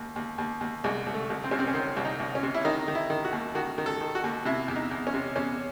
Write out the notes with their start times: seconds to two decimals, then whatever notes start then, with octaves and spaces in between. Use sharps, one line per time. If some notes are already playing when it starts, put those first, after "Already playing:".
Already playing: D#2
0.16 D#2
0.38 D#2
0.61 D#2
0.84 C2 G#3
1.06 C2
1.14 A3
1.30 C2
1.44 C4
1.51 C3 C#4
1.59 C4
1.67 C#4
1.74 D#3 C4
1.96 C2
2.05 D#4
2.20 C2
2.35 C#4
2.43 C3
2.54 E4
2.65 D#3 D#4
2.88 D#3
2.95 E4
3.10 D#3
3.25 F#4
3.32 D#2
3.55 D#3 F#4
3.78 D#3
3.86 A4
4.01 D#3
4.15 F#4
4.24 D#2
4.45 C3 E4
4.68 E2
4.76 D#4
4.91 E2
5.07 C#4
5.14 C3
5.36 E2 C#4